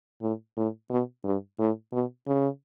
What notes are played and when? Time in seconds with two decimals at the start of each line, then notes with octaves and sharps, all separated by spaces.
0.22 A2
0.57 A2
0.90 B2
1.25 G2
1.59 A2
1.93 B2
2.27 C#3